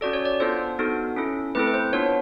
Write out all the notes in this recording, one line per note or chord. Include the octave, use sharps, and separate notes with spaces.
C#4 F#4 A4 D5
C#5
D5
B3 D4 F4 A4 C5
B3 D#4 F#4 A4
C#4 E4 A4
A3 C4 E4 A4 B4
B4
C5
B3 D4 F4 C#5